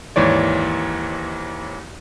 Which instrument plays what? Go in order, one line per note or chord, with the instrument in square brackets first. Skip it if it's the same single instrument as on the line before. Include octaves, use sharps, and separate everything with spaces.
[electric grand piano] D#2 G#2 E3 C#5 D5